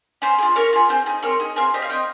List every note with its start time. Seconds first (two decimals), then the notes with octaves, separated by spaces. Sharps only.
0.22 C#4 C5
0.38 F4 G#4
0.56 C#4 A#4 C#5
0.73 F4 G#4
0.89 C4 C5
1.06 D#4 G#4
1.23 C4 A#4 C#5
1.40 D#4 G#4
1.56 C4 F5 G#5
1.74 G4 C5 D#5
1.82 C#5 F5
1.90 C4 D#5 G5